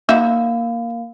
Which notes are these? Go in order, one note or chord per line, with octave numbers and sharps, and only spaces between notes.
A#3 D#4 F#4 E5